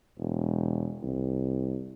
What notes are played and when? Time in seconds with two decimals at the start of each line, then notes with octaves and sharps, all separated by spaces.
0.18 E1
1.03 C2